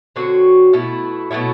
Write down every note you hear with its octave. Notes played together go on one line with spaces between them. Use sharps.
D3 F#3 C4 F#4
B2 A3 E4
B2 F#3 A3 E4